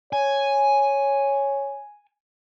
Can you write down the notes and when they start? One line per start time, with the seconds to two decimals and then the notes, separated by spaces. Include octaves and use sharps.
0.13 C#5 G#5